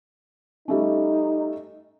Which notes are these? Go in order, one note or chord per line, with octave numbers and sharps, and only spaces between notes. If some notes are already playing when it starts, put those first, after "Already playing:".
G3 A3 C#4 D#4